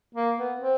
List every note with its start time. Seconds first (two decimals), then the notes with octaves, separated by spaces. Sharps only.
0.15 A#3
0.38 B3
0.60 C4